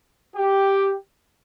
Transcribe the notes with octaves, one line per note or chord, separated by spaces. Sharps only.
G4